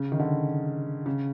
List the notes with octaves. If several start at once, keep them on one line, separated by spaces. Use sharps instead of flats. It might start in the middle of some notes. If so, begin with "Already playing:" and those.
Already playing: C#3
D#3
D3
C#3